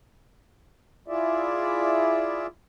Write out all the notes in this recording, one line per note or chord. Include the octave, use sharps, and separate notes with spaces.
E4 F4 G#4 D5 E5